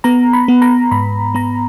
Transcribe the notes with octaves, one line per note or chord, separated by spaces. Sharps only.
B3 A#5
B5
B3
A#5
G#2 B5
B3 A#5